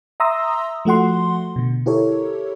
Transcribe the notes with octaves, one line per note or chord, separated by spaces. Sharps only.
E5 A#5 C6 D#6 E6 A#6
F3 A3 F#4 F#5 C6
B2 D3
E4 G4 A4 A#4 C#5